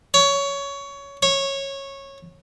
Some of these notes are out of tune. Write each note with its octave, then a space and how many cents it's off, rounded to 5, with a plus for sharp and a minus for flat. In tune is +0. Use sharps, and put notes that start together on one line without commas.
C#5 +15
C#5 -15